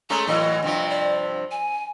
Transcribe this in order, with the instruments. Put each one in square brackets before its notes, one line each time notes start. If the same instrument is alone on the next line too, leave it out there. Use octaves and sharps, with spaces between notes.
[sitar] G#3 A3 C#4 [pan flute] A#5
[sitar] A2 E3 F#3 [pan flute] D#5
[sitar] G2 C3 F3
[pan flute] D5
G#5